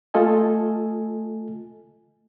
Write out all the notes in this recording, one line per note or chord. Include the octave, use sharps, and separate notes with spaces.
A3 F4 A4 D#5 G#5